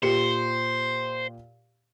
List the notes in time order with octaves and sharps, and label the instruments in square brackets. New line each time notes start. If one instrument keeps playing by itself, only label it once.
[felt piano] A#2 G4 C#7 [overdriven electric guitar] C5